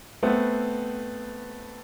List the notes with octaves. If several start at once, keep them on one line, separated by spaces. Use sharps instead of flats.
A3 B3 C4